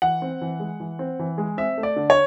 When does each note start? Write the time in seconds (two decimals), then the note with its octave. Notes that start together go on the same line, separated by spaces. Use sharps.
0.02 E3 F#5
0.22 C4
0.41 E3
0.60 G#3
0.80 E3
0.99 C4
1.19 E3
1.38 G#3
1.57 C4 E5
1.78 A3
1.83 D5
1.96 D3
2.10 C#5